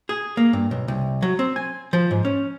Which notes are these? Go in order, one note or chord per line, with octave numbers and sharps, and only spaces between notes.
G#4
A#3
G2
B1
C2
F#3
C4
G#5
F3
G#2
C#4